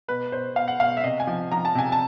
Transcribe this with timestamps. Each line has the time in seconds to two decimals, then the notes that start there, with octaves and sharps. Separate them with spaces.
0.08 B2 B4
0.32 B2 C5
0.56 B2 F5
0.68 F#5
0.80 B2 F5
0.97 E5
1.04 C3 D#5
1.20 G#5
1.27 F3
1.52 F3 A#5
1.65 A5
1.75 C3 G#5
1.92 A5